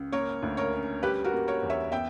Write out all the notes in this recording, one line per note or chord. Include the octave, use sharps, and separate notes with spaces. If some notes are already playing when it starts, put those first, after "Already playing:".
Already playing: C#2
A#3 A#4 C#5
D2
A#4 C#5
C#4
G3 G4 B4
F#4 A#4
A#3
A#4 C#5
E2
C#5 E5
B3 E5 G5